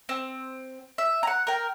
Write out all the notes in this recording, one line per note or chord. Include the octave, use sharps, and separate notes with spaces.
C4
E5
F#5 A#5
A#4 G5